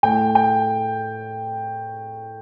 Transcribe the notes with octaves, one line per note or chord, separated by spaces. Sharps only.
A2 A3 G5
G5